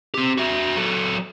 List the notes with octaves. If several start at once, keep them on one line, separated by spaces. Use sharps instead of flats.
C4 G4
F#4 E5
F#3 A4